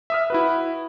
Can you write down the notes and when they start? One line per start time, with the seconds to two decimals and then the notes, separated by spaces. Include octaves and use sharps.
0.10 E5 D#6 F6
0.30 E4 F#4 B4